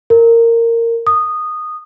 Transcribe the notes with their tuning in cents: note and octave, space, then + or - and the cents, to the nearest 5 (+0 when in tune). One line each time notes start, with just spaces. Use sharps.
A#4 -15
D#6 -15